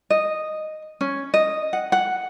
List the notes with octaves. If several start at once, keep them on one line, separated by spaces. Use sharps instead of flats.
D#5
C#4
D#5
F#5
F#5